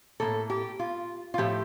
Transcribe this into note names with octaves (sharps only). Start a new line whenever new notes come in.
A2 F3 A#3 A4
G4
F4
F4
A2 F3 A3 G4